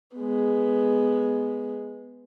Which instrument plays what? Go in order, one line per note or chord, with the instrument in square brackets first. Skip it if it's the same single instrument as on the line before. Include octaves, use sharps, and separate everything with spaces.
[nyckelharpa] G#3 B3